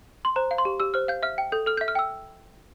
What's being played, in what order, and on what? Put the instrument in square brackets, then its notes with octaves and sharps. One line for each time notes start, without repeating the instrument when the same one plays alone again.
[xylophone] C6
C5 A#5
F5
C6
G4
G4 E6
C5 F6
F5 G6
E5 F6
G5
A4 G6
A4 F6
E5 G6
F6
G5 E6